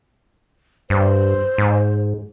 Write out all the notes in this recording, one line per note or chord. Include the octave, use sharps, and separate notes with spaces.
G2 C5
G#2